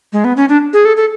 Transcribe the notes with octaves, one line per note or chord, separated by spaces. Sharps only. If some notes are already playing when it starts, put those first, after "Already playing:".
G#3
B3
C#4
D4
G#4
A4
A4